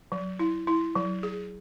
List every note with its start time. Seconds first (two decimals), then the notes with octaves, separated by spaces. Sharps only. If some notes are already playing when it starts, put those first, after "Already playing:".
0.12 F#3
0.39 E4
0.67 E4
0.95 F#3
1.23 G#4